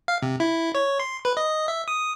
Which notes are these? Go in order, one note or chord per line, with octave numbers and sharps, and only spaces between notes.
F5
C3
E4
C#5
C6
B4
D#5
E5
D#6